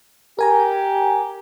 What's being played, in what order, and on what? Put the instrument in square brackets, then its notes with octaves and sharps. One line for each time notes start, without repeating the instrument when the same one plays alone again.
[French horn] G4 [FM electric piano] A#4 G#5 A#5